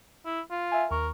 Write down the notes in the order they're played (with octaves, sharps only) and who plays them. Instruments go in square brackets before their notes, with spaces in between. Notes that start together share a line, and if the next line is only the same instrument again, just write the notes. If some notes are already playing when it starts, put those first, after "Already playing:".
[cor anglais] E4
F4
[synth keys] E5 G#5
[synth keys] D#2 C#6 [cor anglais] A#4